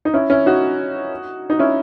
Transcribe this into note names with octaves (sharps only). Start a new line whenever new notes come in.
D#4
C#4 E4
C#4 E4
D#4 F#4
D#4
C#4 E4